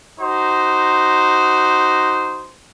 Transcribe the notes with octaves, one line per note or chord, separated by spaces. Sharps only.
D#4 F#4 C5